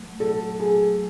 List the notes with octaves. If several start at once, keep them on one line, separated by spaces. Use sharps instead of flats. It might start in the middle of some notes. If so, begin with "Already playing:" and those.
Already playing: F#3 A3
F#3 A4
F#3 G#4